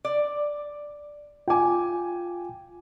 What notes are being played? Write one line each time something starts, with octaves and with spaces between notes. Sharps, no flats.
D5
F4 G5 G#5 D6